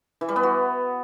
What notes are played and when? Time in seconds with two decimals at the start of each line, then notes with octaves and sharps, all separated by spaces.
0.21 E3
0.28 G3
0.36 B3
0.43 F#4